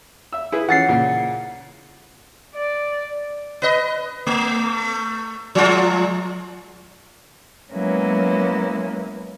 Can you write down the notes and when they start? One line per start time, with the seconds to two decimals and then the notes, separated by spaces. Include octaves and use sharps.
0.33 E5 E6
0.52 E4 G#4 B4
0.68 E3 F3 C#4 F#5 A6 C7
0.89 A#2 C#3
2.55 D5
3.62 B4 D#5
4.27 A3
5.55 F3 G#3 F4
7.73 F#3 G#3 A#3 B3 C#4 E4